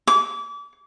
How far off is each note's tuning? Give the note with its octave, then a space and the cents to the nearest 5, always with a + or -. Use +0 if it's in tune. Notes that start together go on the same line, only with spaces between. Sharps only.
D6 -35